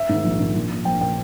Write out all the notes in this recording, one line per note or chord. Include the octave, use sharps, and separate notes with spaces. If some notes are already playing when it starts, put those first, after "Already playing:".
Already playing: E5
G#2 D#3
A#1
G#2 D#3
A#1
A#2
A#1 G5
A#2 G5